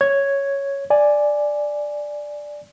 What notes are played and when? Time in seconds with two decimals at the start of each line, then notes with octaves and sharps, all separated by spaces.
0.01 C#5 G#6
0.90 D5 G#5